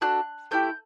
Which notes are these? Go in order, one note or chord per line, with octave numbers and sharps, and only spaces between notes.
D4 F#4 A4 F#6
A3 E4 G4 G6